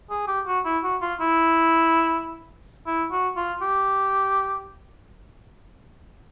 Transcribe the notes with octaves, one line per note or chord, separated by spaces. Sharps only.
G#4
G4
F#4
E4
F#4
F4
E4
E4
F#4
F4
G4